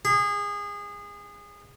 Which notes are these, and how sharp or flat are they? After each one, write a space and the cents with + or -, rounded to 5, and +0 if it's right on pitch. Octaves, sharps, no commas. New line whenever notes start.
G#4 -25